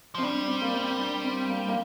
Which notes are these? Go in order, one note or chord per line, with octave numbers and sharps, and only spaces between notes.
F3 C4
G3 D4
C4
A#3
C4
D4
C4
A#3
A#3